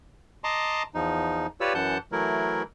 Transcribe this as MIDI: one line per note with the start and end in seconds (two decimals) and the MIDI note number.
0.44 0.83 75
0.44 0.83 81
0.44 0.83 82
0.44 0.83 84
0.44 0.83 86
0.95 1.47 40
0.95 1.47 53
0.95 1.47 63
1.60 1.73 65
1.60 1.73 67
1.60 1.73 71
1.60 1.73 73
1.60 1.73 74
1.60 1.73 88
1.75 1.98 42
1.75 1.98 52
1.75 1.98 78
1.75 1.98 81
1.75 1.98 91
2.12 2.62 52
2.12 2.62 54
2.12 2.62 57
2.12 2.62 64
2.12 2.62 70